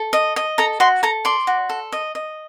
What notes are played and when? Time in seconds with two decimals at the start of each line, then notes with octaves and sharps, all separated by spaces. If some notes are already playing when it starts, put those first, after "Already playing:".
Already playing: A4
0.13 D#5
0.36 D#5
0.58 A4 A#5
0.80 F#4 C6
1.03 A4 A#5
1.25 D5 C6
1.47 F#4
1.69 A4
1.92 D#5
2.15 D#5